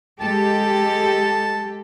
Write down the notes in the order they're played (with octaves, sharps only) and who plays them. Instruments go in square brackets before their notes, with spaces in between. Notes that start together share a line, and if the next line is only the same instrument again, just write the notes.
[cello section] G#3 G4 A4 [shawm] A5